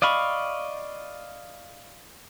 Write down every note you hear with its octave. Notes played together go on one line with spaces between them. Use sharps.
D5 D#5 F5 B5 C#6